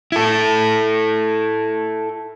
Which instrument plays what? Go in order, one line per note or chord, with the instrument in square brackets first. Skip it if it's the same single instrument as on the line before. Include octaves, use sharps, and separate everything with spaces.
[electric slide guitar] E4 A4